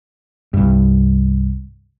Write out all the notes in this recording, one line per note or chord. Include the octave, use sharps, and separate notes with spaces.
C2 G2